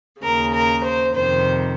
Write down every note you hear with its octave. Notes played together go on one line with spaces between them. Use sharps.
D#2 C#3 A#4
A#4
C5
F2 C3 D#3 C5